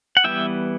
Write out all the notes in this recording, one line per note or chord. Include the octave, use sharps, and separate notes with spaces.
F#5
E3 G3 B3 E4 E5 G5